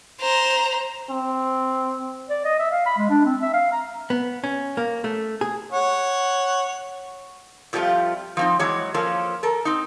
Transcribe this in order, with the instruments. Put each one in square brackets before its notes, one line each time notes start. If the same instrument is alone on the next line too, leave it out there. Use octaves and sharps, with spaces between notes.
[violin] C5 A#5
[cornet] C4
[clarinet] D5
D#5
E5
F5
B5
G#3
D4
C4
E5
F5
A#5
[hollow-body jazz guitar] B3
C#4
A#3
A3
G#4
[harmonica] C#5 F#5
[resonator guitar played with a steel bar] F2 F3 G3 A3 F4
F3 C4 D#4
E3 F#3 G#3 C#5
F3 A#3 C#4 A4
A4 A#4
C4 D#4